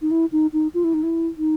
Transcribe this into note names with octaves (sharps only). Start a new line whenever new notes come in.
D#4
E4
D#4
D#4
F4
E4
D#4
E4
D#4